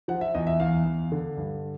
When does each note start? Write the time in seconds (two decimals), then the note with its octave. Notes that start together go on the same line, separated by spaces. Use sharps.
0.08 F3 F#5
0.21 E5
0.34 E2 D#5
0.47 E5
0.60 E2 F5
0.86 E2
1.12 D3
1.37 G2